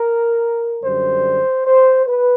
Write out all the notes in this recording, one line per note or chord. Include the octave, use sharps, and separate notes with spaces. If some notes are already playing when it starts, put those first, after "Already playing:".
Already playing: A#4
F#2 D3 G3 C5
C5
B4